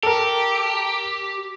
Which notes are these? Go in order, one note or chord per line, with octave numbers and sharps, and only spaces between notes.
G4 A4 A#4